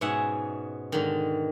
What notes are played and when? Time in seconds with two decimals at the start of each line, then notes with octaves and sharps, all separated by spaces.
0.01 G#2 B2 C#4 E5 F#5 G#5
0.92 G#2 D3 D#3